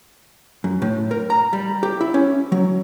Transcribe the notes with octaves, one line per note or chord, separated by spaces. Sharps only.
F#2
A2
A#4
A#5
G3
G4
E4
C#4
F#3